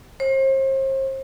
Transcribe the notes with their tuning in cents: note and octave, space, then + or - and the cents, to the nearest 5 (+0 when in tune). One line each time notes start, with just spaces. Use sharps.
C5 +40